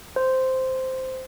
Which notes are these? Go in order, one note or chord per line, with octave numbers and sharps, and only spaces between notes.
C5